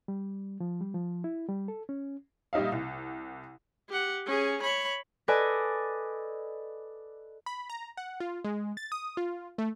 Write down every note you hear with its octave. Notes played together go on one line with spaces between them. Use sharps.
G3
F3
G3
F3
E4
G3
A4
C#4
A#1 G3 D#4 E5 F5
C2
G4 F#5
C#4 G#4
C#5 B5
A4 B4 D5 D#5 G#5
B5
A#5
F#5
F4
G#3
A6
D#6
F4
A3